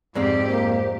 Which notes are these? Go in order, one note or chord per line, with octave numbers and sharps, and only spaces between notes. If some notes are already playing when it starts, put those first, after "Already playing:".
F2 G#2 G#3 C4 G4 D5
A#3 C5